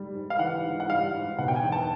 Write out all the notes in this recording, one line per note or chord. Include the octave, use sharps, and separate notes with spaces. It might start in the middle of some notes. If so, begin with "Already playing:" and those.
Already playing: G3
G#2
F5
E3 F#5
G#2
F#5
G3 F5
G#2
B2 F#5
G5
G#5
E2
A5